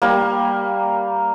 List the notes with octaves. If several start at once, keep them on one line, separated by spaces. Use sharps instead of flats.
G3 A#3